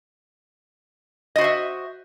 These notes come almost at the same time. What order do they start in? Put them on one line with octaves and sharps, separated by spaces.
D#5 F#4 C5 E5